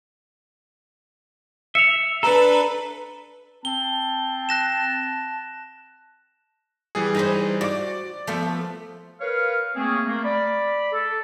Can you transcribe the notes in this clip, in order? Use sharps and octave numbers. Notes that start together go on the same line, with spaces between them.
E5 C#7 F7
D4 A4 B4 A#5
C4 A5 G7
F#6 A#6 E7
E3 G3 G#4
D#4 B4 C5
F#4 D5 D6
F3 A3 B3
A#4 B4 C#5 F5
A3 A#3 C4 C#4 G#4
A3 A#3
D5 B5
A4